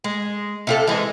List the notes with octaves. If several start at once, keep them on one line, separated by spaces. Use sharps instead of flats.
G#3
C3 F4 A4
E3 G#3